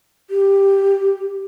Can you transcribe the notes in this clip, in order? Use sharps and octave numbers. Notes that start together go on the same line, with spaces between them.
G4